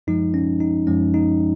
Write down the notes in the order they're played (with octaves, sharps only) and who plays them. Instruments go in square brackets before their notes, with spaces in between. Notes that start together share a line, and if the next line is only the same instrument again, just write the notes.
[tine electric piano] F#2 F3 G#3 D#4
C#4
D#4
F#2 F3 G#3 C#4
D#4